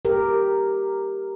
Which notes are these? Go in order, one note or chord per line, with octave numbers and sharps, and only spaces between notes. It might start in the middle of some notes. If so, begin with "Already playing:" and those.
G4 A#4